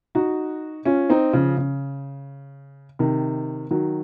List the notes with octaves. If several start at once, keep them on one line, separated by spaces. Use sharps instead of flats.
D#4 F#4
C#4 F4
C4 D#4
C#3 F3
C#3
C3 D#3
D#3 F#3